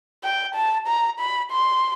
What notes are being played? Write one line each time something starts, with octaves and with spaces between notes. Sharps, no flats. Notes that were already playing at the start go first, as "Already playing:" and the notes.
G5
A5
A#5
B5
C6